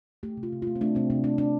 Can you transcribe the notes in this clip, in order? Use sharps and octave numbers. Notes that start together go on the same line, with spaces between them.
A3 G4
C3
F4
C3
A3 F4
C4
A3 D4
C3 C4
C3 D4
A3 D4
A3 D4